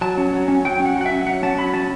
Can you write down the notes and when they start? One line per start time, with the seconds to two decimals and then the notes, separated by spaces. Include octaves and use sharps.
0.01 F#3 A5
0.18 C#4
0.33 F#3
0.48 C#4
0.65 F#3 G5
0.80 C#4
0.85 F#5
0.96 F#3
1.01 F#5
1.06 E5
1.11 C#4
1.27 F#3 F#5
1.43 C#4 A5
1.58 F#3 B5
1.74 C#4 A5